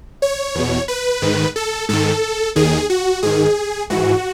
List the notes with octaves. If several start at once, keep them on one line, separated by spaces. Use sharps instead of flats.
C#5
E2 B2
B4
G#2 D#3
A4
G#2 D#3 A4
D#2 D#3 G#4
F#4
G#2 D#3 G#4
G#2 E3 F#4